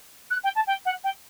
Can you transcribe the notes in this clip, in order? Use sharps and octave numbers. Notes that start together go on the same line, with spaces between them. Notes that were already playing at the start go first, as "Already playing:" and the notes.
F#6
G5
A5
G5
F#5
G5